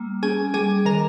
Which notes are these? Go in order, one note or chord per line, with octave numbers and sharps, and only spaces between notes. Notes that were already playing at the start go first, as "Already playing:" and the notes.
Already playing: G3 A#3
C#4 G#4 G#5
G3 G#4 G#5
D#3 A#4 A#5